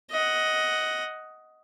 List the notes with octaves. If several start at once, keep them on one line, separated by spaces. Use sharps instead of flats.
D#5 F#5